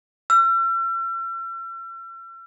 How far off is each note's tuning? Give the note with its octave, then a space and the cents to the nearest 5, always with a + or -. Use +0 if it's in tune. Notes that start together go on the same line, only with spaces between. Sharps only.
E6 +45